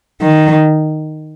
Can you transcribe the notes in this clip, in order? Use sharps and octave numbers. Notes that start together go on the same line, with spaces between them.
D#3